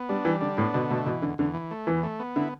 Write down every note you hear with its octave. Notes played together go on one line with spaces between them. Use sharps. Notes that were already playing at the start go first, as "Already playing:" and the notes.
Already playing: B3
G3 D4
E3 G3
D3 D4
A2 B3
B2 D3
B2 A3
B2 E3
E2 D3
E2 D3
E3
A3
E2 E3
A3
B3
D3 E4